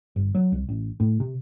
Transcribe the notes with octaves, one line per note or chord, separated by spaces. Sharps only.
G1
F#3
C2
A1
A2
C3